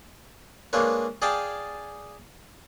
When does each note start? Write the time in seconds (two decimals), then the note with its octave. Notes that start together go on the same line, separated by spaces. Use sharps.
0.73 G#3 A#3 D4 B4 C#5
1.22 G#4 D5 D#5 F5 G5 A5